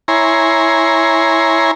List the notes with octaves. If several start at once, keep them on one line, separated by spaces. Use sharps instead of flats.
E4 C#5 G#5 A#5 C6